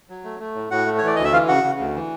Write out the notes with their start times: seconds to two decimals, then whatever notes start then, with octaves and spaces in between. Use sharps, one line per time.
0.10 F#3
0.24 A3
0.40 A3
0.55 A2
0.71 A2 F#4 F#5
0.86 A3
0.98 C#5
1.02 E3 D5
1.16 D2 D#5
1.24 E5
1.33 E3 F4 F5
1.48 C#3 F#4 F#5
1.63 C#3
1.79 D2
1.95 E3